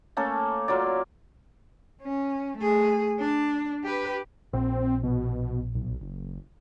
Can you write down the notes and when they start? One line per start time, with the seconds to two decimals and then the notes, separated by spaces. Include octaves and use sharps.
0.17 A3 A#3 C#4 A4
0.68 F#3 A#3 F4 D5
2.02 C#4
2.58 A3 G#4
3.19 D4
3.84 G4 B4
4.53 A#1 C4
5.03 B2
5.75 B1
6.01 F#1